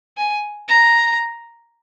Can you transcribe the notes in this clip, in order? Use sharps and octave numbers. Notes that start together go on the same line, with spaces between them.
G#5
A#5